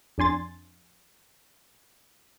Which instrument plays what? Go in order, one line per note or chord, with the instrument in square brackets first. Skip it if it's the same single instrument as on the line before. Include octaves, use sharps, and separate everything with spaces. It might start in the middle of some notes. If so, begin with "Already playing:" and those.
[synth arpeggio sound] F2 D4 G#5 C6 A6